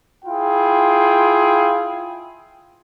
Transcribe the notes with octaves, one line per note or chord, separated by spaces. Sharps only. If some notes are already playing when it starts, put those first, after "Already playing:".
E4 F4 G#4 G5